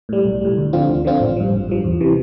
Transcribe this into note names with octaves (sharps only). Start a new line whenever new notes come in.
A2 G3
B1
A2 G3
D2
D3 F3 C4 F4
D2
D3 F3 C4 F4
A1
G2 F3
A1
G2 F3
E2
C3 E3